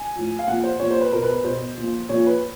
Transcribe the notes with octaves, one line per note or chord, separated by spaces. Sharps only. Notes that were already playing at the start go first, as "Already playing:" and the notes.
Already playing: G#5
A2 F3
F5
A#2 F3 F#5
C5
A#2 F3 C#5
C5
B4
B2 A#4
B4
B4
B2 C5
A#2 F3
A#2 F3 C#5
B4